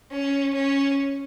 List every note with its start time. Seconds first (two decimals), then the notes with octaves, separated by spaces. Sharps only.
0.11 C#4
0.55 C#4